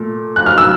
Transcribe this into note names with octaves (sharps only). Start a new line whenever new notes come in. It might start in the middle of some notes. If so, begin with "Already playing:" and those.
Already playing: A#2 A3
F#6
F6
E6